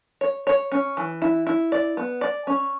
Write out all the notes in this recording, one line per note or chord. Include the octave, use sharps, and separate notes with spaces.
C#5
C#5
C#4
E3
E4
E4
D5
B3
D5
C#4